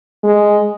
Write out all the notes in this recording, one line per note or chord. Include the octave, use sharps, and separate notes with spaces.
G#3